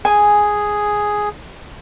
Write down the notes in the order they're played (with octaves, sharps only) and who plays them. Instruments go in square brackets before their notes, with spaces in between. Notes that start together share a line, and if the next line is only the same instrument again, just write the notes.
[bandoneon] G#4 [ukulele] G#5